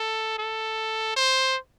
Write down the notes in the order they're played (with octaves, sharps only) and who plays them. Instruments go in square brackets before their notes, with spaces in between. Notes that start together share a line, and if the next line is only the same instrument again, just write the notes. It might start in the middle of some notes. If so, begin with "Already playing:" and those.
Already playing: [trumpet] A4
A4
C5